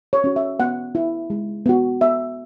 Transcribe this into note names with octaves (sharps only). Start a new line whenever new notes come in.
C#5
C#4 F#4
E5
B3 F#5
E4
G#3
B3 F#4
B3 E5